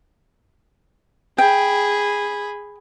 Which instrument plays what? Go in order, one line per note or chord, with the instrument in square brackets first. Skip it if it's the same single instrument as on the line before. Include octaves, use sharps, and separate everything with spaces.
[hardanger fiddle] G#4 B5 [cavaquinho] G5